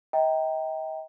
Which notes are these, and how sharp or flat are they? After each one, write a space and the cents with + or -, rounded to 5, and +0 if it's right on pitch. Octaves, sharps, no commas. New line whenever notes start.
D#5 +40 G5 -5 A#5 +0